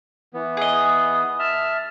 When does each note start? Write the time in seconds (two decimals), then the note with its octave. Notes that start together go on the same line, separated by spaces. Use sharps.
0.34 E3 B3
0.57 G#4 D#5
1.39 E5 A5 F6